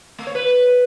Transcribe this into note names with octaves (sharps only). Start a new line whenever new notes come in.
A3
C#5
B4